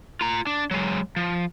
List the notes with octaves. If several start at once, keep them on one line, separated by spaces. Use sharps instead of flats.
F4 A#5
D4
F#3 G#3
F3